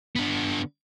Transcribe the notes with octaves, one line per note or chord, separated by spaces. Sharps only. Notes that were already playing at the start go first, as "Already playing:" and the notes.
D3 B3